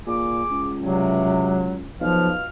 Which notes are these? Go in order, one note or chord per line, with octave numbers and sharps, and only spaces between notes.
A#2 G#4 D6
C#2
G2 C3 F#3
B1 B2 F3 F4 F6